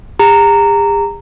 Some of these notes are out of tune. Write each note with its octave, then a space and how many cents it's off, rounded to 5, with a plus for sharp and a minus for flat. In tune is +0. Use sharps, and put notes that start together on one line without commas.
G#4 -45 A#5 -15